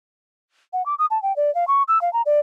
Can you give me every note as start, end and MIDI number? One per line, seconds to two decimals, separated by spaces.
0.73 0.85 78
0.86 0.95 86
0.99 1.06 87
1.11 1.21 81
1.22 1.35 79
1.36 1.53 74
1.55 1.67 77
1.68 1.83 85
1.88 2.01 88
2.01 2.12 77
2.13 2.22 82
2.26 2.40 74